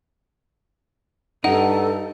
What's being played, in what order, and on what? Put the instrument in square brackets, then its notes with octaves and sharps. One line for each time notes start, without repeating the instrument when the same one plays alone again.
[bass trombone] G2 [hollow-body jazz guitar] D#4 [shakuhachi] A4 [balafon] F#5